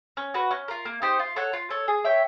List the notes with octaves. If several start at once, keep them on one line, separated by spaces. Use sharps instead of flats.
C#4
F#4 B4
C#4
F4 A#4
A#3
D#4 G4 C5
F4
A4 C#5 F#5
F4
A4 C#5
G#4
C#5 E5 G5